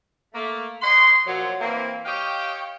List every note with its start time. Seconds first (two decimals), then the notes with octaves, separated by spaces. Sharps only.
0.34 A3 A#3
0.82 C#5 D#5 F#5 C6
1.26 A#2 F3 F#3
1.61 E3 A#3 C4
2.05 G4 C#5 D#5 F5 G5